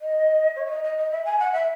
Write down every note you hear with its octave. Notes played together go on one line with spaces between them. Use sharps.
D#5
C#5
E5
D#5
D#5
D#5
E5
G#5
F#5
E5